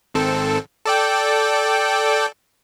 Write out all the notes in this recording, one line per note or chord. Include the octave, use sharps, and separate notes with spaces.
G#1 C4 A4
A4 D5 G5